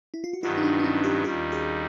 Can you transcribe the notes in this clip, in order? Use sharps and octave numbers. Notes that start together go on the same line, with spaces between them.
E4
F4
F#4
G2 D#3 F#3 B3 F4 G4
D#4
D4 E4
D4
C#4 D#4
F4 G4
D#2 D#3 G3 F4 G4
F#4 G#4